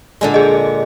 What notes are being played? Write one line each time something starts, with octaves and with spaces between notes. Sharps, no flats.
A#2 D3 G#3
G#4 D#5